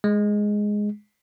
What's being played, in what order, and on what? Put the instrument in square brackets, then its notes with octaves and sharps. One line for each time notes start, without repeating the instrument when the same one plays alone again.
[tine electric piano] G#3